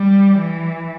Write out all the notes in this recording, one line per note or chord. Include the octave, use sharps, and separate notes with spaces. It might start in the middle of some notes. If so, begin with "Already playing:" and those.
Already playing: G3
E3